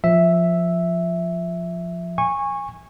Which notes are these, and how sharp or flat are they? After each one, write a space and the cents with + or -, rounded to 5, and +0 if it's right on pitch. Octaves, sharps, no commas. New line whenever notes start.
F3 +0 E5 +0
G#5 -20 C#6 -15